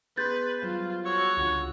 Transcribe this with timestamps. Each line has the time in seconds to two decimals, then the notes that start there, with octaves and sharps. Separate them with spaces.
0.17 B3 G#4 B4 C6 G6 A6
0.62 F#3 G3 F4 C5
1.05 F#4 C#5 E6 C#7
1.37 C#2 D3 F4